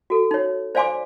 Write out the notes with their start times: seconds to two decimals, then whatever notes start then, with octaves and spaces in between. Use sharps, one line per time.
0.10 F#4 A4
0.31 D#4 C#5
0.75 C5 D5 F5 G#5 C6 D6